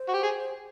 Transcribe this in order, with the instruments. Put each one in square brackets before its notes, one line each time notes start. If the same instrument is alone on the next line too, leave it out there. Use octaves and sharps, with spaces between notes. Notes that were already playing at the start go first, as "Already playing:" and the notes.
Already playing: [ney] C5
[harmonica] F#4
G4
G#4